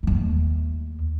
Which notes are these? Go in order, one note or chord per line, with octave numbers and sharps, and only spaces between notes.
D#2 A3